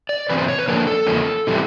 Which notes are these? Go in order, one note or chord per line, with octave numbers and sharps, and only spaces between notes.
D5
C3 E3 C4 B4
C5
C#5
B4
D3 F3 A#3 D4 A#4
A4
E2 C#3 F3 A#3 C#4
C3 E3 G3